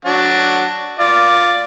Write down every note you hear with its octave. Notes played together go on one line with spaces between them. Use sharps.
F#3 D4 F#4
F4 D5